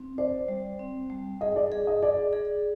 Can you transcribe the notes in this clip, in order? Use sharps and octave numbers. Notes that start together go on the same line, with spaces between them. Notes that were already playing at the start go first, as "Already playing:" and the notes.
Already playing: C4
C5 D5
G3
C4
G3
G#4 D#5
D5
G#4
D#5
G#4 D5
G#4